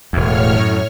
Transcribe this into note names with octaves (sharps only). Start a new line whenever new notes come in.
E1 E2 A2 C#5 F6
F#2